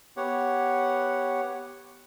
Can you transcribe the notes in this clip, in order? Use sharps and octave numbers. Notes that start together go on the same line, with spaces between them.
B3 G4 C#5 F#5